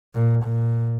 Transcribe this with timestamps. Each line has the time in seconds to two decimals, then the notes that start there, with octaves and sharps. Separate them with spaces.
0.15 A#2
0.44 A#2